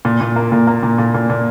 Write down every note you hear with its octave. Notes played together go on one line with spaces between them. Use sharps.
A#2
A#2
A#3
A#2
A#3
A#2
A#2
A#2
A#2